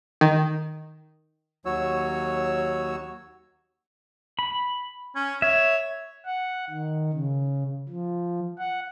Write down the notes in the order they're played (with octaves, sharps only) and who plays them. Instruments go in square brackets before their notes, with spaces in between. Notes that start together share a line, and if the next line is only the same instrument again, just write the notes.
[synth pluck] D#3
[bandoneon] D#2 F#3 F#4 C#5 E6
[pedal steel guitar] B5
[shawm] C#4
[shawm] C#5 [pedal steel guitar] E5
[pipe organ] F#5
D#3
C#3
F3
F#5